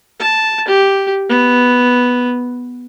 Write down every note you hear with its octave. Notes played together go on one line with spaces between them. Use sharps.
A5
G4
B3